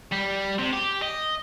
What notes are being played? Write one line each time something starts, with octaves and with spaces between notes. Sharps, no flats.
G3
C3
G4
D#5